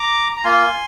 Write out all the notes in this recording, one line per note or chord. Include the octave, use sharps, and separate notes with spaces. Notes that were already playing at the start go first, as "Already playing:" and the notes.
Already playing: A#5 D6
A#5
A#3 F4 G#5 C6